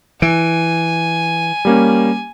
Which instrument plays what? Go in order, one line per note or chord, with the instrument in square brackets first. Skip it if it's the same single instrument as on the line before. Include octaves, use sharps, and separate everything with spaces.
[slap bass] E3 [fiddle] G#5 [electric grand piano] D7
[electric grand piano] G3 A#3 C#4